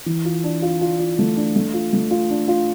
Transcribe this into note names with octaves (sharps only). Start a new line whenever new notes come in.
E3
F4
D4
F4
F4
F4
A3
D4
A3
F4
A3
F4
D4
F4